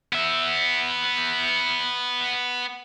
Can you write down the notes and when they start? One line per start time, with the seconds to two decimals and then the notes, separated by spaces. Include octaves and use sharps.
0.13 B3 E5